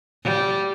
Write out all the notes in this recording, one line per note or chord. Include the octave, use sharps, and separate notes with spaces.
G3